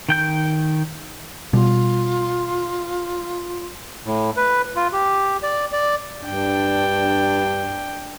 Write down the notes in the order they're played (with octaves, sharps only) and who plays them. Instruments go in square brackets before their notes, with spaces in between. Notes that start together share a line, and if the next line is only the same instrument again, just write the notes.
[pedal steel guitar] D#3 G5 G6
[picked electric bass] B2 G3 [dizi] F4
[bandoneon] A2
B4
F4
G4
D5
D5
[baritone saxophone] G2 [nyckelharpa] D4 G5